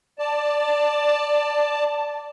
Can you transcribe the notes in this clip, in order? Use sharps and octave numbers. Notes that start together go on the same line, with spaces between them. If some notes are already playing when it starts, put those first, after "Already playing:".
D5 A5